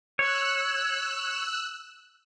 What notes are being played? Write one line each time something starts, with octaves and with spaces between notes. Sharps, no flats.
C#5 E6 F#6